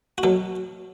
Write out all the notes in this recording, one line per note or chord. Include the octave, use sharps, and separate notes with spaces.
F#4
B2 F#3 A4